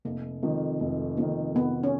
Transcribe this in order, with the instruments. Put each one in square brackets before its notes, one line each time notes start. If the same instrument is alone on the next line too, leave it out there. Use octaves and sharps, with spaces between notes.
[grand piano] F1 [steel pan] A#3
[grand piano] F2 D#3 [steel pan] G#3
[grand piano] F1 [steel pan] G#3
[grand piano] F2 D#3 [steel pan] A#3
[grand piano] F1 [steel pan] B3
[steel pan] C#4